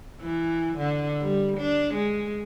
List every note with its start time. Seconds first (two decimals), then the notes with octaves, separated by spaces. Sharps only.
0.21 E3
0.78 D3
1.21 G3
1.58 D4
1.94 G#3